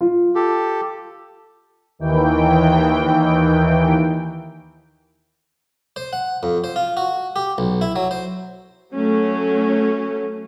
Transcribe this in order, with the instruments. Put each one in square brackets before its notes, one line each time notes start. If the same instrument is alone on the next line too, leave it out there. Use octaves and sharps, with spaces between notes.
[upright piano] F4
[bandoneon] G4 A4
[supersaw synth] D#2 D#3 E3 G5
[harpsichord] C5
F#5
F2
C5
F4
F#4
G4
B1
E4
F#3
C5
[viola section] F#3 A3 C#4